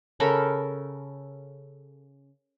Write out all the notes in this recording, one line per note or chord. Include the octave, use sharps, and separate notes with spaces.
C#3 A4 A#4 B5